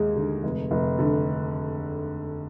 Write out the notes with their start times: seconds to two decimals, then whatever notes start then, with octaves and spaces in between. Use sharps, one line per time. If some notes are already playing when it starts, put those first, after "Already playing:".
Already playing: D#2 G#3
0.16 D3
0.43 F1
0.71 F1
0.99 D3